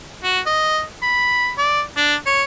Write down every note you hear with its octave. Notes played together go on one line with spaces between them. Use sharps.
F#4
D#5
B5
D5
D4
C#5